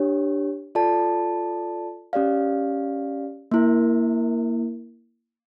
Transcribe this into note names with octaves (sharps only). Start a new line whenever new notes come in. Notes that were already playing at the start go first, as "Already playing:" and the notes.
Already playing: D4 G4 C#5
F4 A4 D5 A5
C#4 G4 D5 F5
A#3 E4 A#4